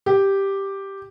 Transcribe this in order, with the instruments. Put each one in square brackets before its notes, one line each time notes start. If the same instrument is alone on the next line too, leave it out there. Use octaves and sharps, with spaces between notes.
[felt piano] G4